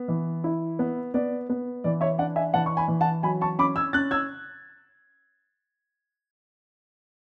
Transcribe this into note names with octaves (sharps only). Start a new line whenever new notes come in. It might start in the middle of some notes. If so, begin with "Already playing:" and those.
Already playing: B3
E3
E4
B3
B3 D5
B3
E3 D5
C#5 E5
D4 D5 F#5
E5 G#5
E3 F#5 A5
C#6
G#5 B5
E3
F#5 A5
F#3 G#5 B5
A5 C#6
C#4 B5 D6
E6 G#6
C#4 F#6 A6
E6 G#6